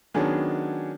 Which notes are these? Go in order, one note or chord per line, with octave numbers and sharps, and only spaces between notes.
D#3 F#3 B3 C#4 D4 G#4